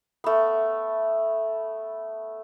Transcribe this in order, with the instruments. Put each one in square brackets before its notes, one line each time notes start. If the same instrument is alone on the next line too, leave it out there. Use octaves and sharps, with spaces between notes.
[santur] A3 B3